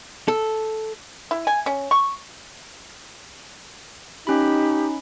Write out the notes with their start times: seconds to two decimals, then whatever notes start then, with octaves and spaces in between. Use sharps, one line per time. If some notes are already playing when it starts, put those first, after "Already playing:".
0.28 A4
1.31 E4
1.47 G#5
1.66 C#4
1.91 C#6
4.27 C#4 D#4 G4 B5